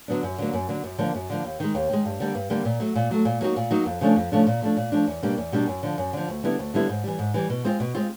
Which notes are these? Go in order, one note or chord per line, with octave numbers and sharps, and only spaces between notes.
D3 F#3 B3 D4
F#2
D3 F#3 A#3
F#2
D3 F#3 A#3
F#2
D3 F3 A#3
F#2
D3 F3 A#3
D#2
D#3 G#3
D#2
D#3 G#3
G2
D3 G3 A#3
G2
D3 G3 A#3
A#2
F#3 A3
A#2
F#3 A3
A#2
F#3 A#3 D#4 F#4
A#2
F#3 A#3 D#4 F#4
F2
C#3 F3 A3 D4
F2
C#3 F3 A3 D4
A#2
F3 A3 D4
A#2
F3 A3 D4
E2
B2 G3 A#3 D4
E2
B2 G3 A#3 D4
F#2
D3 F3
F#2
D3 F3
D2
D3 G3 B3 E4
D2
D3 G3 B3 E4
G#2
E3 G3
G#2
E3 G3
B2
G#3 C4 F4
B2
G#3 C4 F4